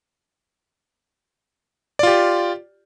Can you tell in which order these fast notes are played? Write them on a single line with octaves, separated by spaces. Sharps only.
D5 F4 G4